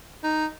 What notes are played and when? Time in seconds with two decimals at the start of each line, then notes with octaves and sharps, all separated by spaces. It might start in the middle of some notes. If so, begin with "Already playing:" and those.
0.24 D#4